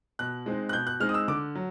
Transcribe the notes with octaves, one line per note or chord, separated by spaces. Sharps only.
B2 F#6
G#3 C4 D#4
F#6
B2 G6
F#6
G#3 C4 D#4 F6
D#6
E6
D3 D6
F#3